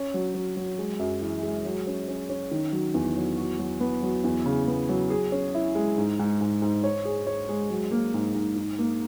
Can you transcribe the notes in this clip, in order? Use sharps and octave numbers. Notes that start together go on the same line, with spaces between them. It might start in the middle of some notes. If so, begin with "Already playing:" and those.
Already playing: C#4
F#3
F#3
F#3
G#3
F#2
E3
G#3
F#3
C#4
C#4
C#4
D#3
F#3
E2
F#3
F#4
F#3
B3
F#3
E2
C#3
B3
F#3
G#4
C#4
E4
G#3
G#2
G#2
G#2
G#2
C#5
G#4
C#5
G#3
F#3
A#3
G#2
G#2
D#4
A#3